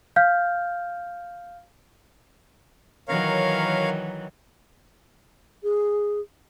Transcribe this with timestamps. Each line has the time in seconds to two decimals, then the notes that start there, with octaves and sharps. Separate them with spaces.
0.16 F5 F6 G6
3.08 D#3 E3 F#3 A#4 C#5 F5
5.63 G#4